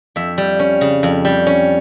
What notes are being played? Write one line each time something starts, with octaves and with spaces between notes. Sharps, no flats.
F2 E5
G3
C#4
C#3
F2
G3
C#4